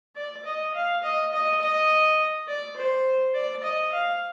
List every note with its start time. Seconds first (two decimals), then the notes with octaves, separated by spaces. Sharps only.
0.16 D5
0.45 D#5
0.75 F5
1.03 D#5
1.33 D#5
1.61 D#5
2.48 D5
2.76 C5
3.35 D5
3.63 D#5
3.92 F5